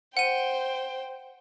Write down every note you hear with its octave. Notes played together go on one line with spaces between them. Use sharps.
C5 F#5 G5 D#7